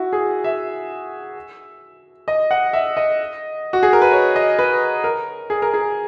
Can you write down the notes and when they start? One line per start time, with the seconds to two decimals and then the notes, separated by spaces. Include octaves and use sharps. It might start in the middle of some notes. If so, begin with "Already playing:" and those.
Already playing: E4 F#4
0.13 G#4
0.44 E5
2.28 D#5
2.51 F#5
2.73 E5
2.97 D#5
3.73 F#4
3.83 G#4
3.93 A#4
4.02 B4
4.12 C#5
4.36 D#5
4.59 B4
5.04 A#4
5.50 G#4
5.62 A#4
5.74 G#4